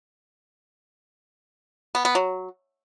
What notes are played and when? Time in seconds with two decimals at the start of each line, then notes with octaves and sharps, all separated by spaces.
1.95 B3
2.05 B3
2.15 F#3